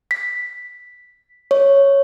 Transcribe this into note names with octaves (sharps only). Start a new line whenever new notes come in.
B6
C#5